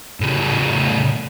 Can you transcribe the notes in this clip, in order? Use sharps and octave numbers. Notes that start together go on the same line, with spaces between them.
A2 C#3